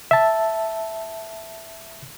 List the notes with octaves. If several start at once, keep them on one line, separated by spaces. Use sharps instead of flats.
E5 A5